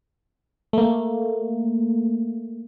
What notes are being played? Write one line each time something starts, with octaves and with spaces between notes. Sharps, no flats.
A3 A#3